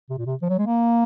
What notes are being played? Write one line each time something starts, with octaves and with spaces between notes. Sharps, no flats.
C3
A#2
C3
F3
F#3
G#3
A#3